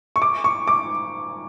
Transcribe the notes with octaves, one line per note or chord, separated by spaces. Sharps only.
C#6
D6
C#6
D6